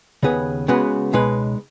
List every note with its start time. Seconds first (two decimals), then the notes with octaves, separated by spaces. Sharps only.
0.23 D#2 C#3 B3 G#4 B4
0.68 C#3 G#3 B3 F#4 B4
1.13 C#2 B2 G#3 D#4 B4